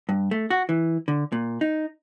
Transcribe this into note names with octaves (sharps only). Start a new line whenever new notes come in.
G2
A3
F#4
E3
D3
A#2
D#4